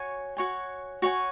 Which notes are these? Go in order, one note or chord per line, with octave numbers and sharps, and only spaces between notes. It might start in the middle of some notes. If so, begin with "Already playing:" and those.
Already playing: F#4 C#5 G#5
F#4 C#5 G#5
F#4 C#5 G#5